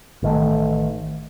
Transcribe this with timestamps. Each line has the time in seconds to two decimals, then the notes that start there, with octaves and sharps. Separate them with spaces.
0.23 A1 D#3 A3